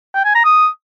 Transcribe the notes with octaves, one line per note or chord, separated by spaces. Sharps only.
G5
G#5
A#5
D#6